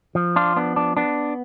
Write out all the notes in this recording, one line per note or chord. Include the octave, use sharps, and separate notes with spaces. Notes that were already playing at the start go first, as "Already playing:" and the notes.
F3
D4 F4
B3 D4
D4
B3 D4